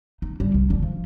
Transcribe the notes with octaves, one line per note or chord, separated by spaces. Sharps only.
D#4
G3
C2
D3
F3